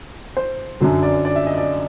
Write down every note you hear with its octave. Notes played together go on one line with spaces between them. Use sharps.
C5
F#2 D3 F#3
D5
D5
E5
D#5
D5